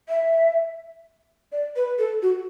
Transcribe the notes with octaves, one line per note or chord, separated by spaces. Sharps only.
E5
D5
B4
A4
F#4